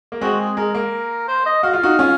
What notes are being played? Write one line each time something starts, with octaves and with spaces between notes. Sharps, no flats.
A#3
G#3 C4 F#4
G#4
G#3 A#4
A#3
C5
D#5
F#4 F5
F4
D#4 F#4
C#4 F4